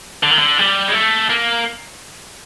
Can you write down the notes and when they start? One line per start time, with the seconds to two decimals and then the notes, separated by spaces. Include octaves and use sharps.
0.23 D3
0.31 D#3
0.38 D3
0.58 G3
0.88 G#3
0.94 A3
1.29 A#3